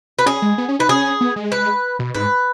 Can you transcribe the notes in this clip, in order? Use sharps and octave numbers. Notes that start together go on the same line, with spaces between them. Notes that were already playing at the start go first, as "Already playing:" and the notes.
B4
C#4 G#4
G#3
B3
C#4
D#4 B4
C#4 G#4
B3
G#3
B4
B2
G#2 B4